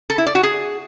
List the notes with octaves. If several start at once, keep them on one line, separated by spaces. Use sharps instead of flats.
A4
E4
D5
F#4
G#4